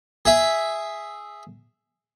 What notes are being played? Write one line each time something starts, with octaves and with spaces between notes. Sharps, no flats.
G#4 E5